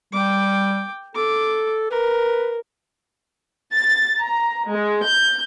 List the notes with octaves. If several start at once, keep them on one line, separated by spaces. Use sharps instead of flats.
G3 G5 D6
A4 D6
A#4 B4
A6
A#5
G#3
G6